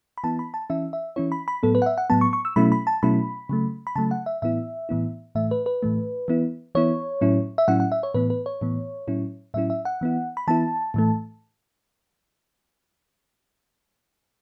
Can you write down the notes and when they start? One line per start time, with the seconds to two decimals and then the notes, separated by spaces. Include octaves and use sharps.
0.18 B5
0.24 E3 B3 E4 A5
0.39 B5
0.54 A5
0.70 E3 C#4 E4 E5
0.93 E5
1.16 E3 C#4 E4 C#5
1.32 B5
1.48 B5
1.63 A2 F#3 B3 A4
1.75 B4
1.82 F#5
1.86 E5
1.98 F#5
2.10 A2 F#3 B3 A5
2.21 C#6
2.33 C#6
2.45 E6
2.56 B2 F#3 A3 C#4 E4 B5
2.72 B5
2.87 A5
3.03 B2 F#3 A3 C#4 E4 B5
3.49 C#3 F#3 A3
3.87 B5
3.96 C#3 F#3 A3 A5
4.11 F#5
4.26 E5
4.42 A2 E3 B3 E4 E5
4.89 A2 E3 B3 E4
5.35 A2 E3 A3 E5
5.51 B4
5.66 B4
5.83 A2 E3 A3
6.28 E3 B3 E4
6.75 E3 B3 E4 C#5
7.21 A2 F#3 C#4 E4
7.58 E5
7.68 A2 F#3 C#4 E4 F#5
7.80 F#5
7.92 E5
8.03 C#5
8.14 A2 E3 B3 B4
8.30 B4
8.46 C#5
8.61 A2 E3 B3
9.08 A2 F#3 C#4 E4
9.54 A2 F#3 C#4 E4 E5
9.70 E5
9.85 F#5
10.01 E3 B3 E4
10.37 B5
10.48 E3 B3 E4 A5
10.94 A2 E3 A3